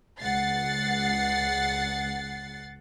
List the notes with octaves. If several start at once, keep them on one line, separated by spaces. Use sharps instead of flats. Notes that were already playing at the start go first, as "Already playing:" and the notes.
C#2 F#5 A6 C7